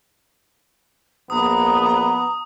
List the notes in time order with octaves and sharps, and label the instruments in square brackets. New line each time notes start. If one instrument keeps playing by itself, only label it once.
[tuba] A#1 [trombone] B3 [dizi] A#5 [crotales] D#6